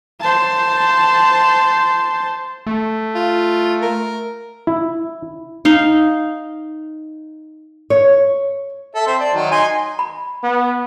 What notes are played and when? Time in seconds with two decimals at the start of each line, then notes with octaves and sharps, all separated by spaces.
0.20 C5 A5
2.67 A3
3.15 F4
3.82 A#4
4.67 E4
5.65 D#4 F5
7.90 C#5
8.95 A4 E5
9.07 C4 E5 C6
9.20 D5 A5
9.34 D#3 F#3
9.51 D#4 G#5 C6
9.99 B5
10.43 B3